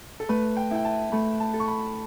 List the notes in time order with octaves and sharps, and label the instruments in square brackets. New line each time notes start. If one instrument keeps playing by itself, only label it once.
[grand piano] A4
[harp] A3 [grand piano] B4
[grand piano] G5
[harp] E4 [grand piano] G5
[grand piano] A5
[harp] A3 [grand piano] B5
[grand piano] A5
[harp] A4
[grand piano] C#6
B5